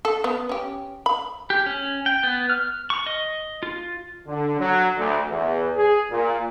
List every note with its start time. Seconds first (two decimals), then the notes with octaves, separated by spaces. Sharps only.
0.05 A4
0.24 B3
0.49 C#4 G4
1.06 B5
1.50 G4
1.66 C#4
2.06 G5
2.23 B3
2.50 F6
2.90 C#6
3.06 D#5
3.63 F4
4.27 D3
4.59 F#3
4.98 D2
5.29 E2
5.76 G#4
6.11 A#2